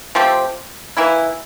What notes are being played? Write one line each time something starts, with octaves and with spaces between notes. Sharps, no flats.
F3 A3 C4 G4
E3 A#3 E4